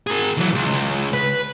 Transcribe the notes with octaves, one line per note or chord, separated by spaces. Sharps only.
G#4 A#4
E3 F#3
C#2
B4